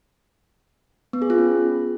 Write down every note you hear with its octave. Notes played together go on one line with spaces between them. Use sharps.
B3
G#4
F4
C#4